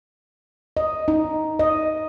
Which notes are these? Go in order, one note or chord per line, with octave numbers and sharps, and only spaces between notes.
D#5
D#4
D#5